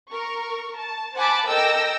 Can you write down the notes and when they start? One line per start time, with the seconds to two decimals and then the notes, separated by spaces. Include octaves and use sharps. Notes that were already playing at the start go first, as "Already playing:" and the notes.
0.11 A#4 C#6
0.79 A5
1.16 C5 F#5 G#5 A5 B5 D6
1.47 A4 A#4 D#5 G5 E6 A#6